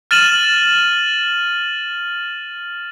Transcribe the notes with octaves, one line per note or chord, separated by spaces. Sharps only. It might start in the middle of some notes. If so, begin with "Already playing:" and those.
F6 A6 D#7 E7 F#7